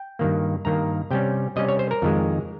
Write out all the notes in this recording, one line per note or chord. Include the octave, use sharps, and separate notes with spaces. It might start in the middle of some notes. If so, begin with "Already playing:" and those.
Already playing: G5
G2 D#3 A#3
G2 D#3 A#3 A#5
C3 G3 C#4 G5
C3 G3 C#4 D#5
C#5
C5
A#4
F2 D#3 G#3